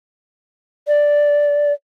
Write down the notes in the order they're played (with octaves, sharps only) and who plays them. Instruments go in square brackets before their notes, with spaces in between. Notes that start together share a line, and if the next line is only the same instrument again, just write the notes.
[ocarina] D5